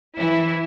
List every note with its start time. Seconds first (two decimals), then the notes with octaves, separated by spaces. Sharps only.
0.17 E3 E4